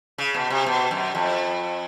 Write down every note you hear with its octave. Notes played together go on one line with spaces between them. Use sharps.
C#3
B2
C3
B2
F#2
F2